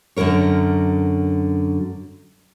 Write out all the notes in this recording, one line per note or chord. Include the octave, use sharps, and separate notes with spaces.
F#2 D3 F#3 A#4 C#5